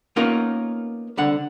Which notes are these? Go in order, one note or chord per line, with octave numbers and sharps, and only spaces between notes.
A#3 B3 C#4 D#4 F4 A#4
C2 D3 F#5